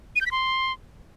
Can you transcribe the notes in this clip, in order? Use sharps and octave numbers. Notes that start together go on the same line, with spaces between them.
D#7
G6
B6
C6